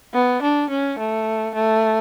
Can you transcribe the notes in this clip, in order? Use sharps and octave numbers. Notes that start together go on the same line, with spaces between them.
B3
D4
C#4
A3
A3